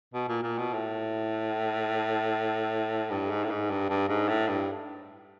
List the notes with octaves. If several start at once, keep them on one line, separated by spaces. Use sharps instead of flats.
B2
A#2
A#2
B2
A2
G2
G#2
A2
G#2
G2
G2
G#2
A2
G2